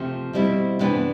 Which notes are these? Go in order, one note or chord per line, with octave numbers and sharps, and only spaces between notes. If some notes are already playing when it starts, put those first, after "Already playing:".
Already playing: C3 F3 A3
B2 G3 C4 E4
C3 E3 B3 D4